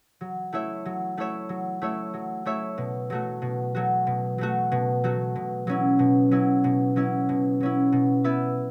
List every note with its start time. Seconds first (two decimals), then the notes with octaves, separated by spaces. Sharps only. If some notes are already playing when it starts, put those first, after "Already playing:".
0.21 F#3
0.53 A3 E4 C#5 E5
0.85 F#3
1.17 A3 E4 C#5 E5
1.49 F#3
1.82 A3 E4 C#5 E5
2.14 F#3
2.46 A3 E4 C#5 E5
2.78 B2
3.10 F#3 A3 F#4
3.42 B2
3.75 F#3 A3 F#4
4.07 B2
4.38 F#3 A3 F#4
4.72 B2
5.04 F#3 A3 F#4
5.36 B2
5.67 F#3 C#4 E4
5.99 B2
6.31 F#3 C#4 E4
6.64 B2
6.96 F#3 C#4 E4
7.29 B2
7.61 F#3 C#4 E4
7.92 B2
8.24 B3 E4 B4 E5